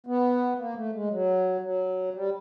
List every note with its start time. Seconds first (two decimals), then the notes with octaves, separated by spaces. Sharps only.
0.07 B3
0.59 A#3
0.75 A3
0.93 G#3
1.10 F#3
1.62 F#3
2.14 G3